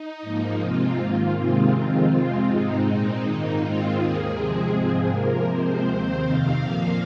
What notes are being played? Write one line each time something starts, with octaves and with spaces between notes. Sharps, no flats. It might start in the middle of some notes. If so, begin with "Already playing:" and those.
Already playing: D#4
G#2 F3 A#3
C3 G#3 C4 F4
G#2 D#3 A#3
C3 D#3 G#3 C4 F4
F2 D#3 G#3 C4
C3 G#3 C4 F4
G#2 G#3 C4 D#4
A#2 G#3 C4 D#4
G#2 D#3 A#3
G#2 D#3 G#3 C4 F4
D#2 D#3 A#3 G#4
C3 F3 G#3 C4 G#4
G#2 F3 G#3 C4
C3 F3 A#3 A#4
C3 F3 G#3 C4 C5
D#2 D#3 C4
F2 C3 D#3 C4 F5
A#2 F3 A#3